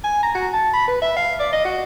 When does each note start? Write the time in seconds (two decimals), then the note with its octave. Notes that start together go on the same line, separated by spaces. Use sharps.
0.04 G#5
0.23 A#5
0.35 F#4
0.53 A5
0.74 B5
0.88 B4
1.02 E5
1.17 F5
1.40 D5
1.52 D#5
1.65 F#4